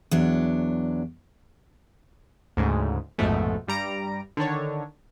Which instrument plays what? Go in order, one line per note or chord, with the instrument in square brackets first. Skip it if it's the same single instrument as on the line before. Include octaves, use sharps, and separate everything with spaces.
[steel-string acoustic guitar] E2 F#3 D4
[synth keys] D2 G#2 C#3
A#1 F2 G#2 B2 G#3 A3
G2 G3 A#5 D7
D3 D#3 D4 C#5